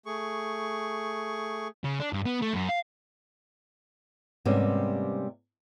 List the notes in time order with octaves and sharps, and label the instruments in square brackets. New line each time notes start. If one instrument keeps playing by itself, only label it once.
[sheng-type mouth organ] A3 G#4 C#6
[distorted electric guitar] C#3
D4
G2
B3
A3
F#2
F5
[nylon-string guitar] G#2 C3 G3 A#3 B3 C#4